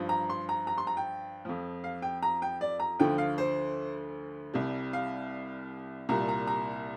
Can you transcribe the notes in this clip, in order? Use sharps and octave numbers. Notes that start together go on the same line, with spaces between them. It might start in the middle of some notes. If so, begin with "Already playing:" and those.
Already playing: G2 F3
A#5
C6
A#5
A#5
C6
A#5
G5
F2 F3
F5
G5
A#5
G5
D5
A#5
D2 D3 F3 G5
F5
C5
C2 C3 G3
F5
C2 A#2 G3 A#5
A#5
A#5